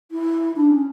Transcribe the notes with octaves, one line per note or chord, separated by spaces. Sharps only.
E4
D4
C#4